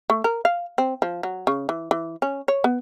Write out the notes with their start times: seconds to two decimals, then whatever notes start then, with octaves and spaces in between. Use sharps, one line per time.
0.10 A3
0.24 A#4
0.45 F5
0.78 C4
1.02 F3
1.23 F#3
1.47 C#3
1.69 E3
1.91 E3
2.22 C#4
2.48 C#5
2.64 B3